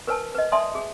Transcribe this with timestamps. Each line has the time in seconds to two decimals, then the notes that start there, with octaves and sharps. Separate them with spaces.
0.07 A#4 B4 C#5 G#5 A5
0.35 B4 D#5
0.52 D5 E5 G#5 A5 C6 D#6
0.75 G#4